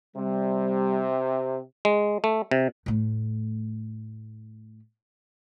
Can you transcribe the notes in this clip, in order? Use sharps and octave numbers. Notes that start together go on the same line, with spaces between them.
C3 G3
G#3
A3
C3
A2 A3